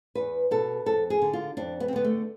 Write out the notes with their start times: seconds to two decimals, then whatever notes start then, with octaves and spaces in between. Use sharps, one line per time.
0.15 E2 B4
0.51 B2 A4
0.86 F2 A4
1.10 G#4
1.22 D3
1.33 F4
1.57 F2 D4
1.80 B3
1.88 C4
1.93 D3 B3
2.04 A3